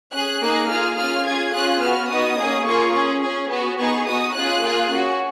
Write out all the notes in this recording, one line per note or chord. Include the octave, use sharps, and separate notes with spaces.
C#4 G#4 F#6
A#3 D#4 G#4
A#3 F4 G#4 F6
C#4 F4 G#4 F6
C#4 F4 G#4 G#6
C#4 F4 G#4 F#6
B3 F#4 F6
B3 D#4 F#4 D#6
A#3 C#4 G#4
A#3 F4 G#4 C#6
C#4 G#4
C#4 G#4
B3 F#4
B3 D#4 G#4 C#6
B3 D#4 F#4 D#6
C#4 F4 G#4 F#6
A#3 F4 G#4
C#4 F#4